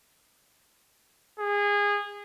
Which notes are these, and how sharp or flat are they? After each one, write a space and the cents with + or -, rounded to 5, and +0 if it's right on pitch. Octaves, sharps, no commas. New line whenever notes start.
G#4 -25